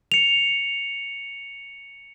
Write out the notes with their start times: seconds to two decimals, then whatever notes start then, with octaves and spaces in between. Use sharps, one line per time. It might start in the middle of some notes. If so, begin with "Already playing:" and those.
0.12 C#7 F7